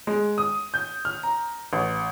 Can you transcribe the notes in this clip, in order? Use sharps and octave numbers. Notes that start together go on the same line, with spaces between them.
G#3
D#6
G6
F6
A#5
A1